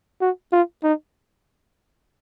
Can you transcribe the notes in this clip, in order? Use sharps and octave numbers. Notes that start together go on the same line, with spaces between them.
F#4
F4
D#4